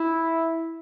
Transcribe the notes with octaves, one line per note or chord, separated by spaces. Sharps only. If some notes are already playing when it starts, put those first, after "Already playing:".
Already playing: E4